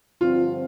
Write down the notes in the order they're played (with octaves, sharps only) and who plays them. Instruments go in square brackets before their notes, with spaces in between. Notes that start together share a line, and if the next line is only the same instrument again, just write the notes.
[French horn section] G2 D3 F3 C4 [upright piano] F4